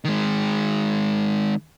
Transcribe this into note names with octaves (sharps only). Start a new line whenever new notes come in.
D#3 G#3